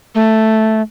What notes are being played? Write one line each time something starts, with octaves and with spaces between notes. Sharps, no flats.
A3